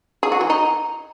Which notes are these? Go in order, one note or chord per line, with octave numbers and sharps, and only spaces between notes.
G#4
F#4
E3
D#4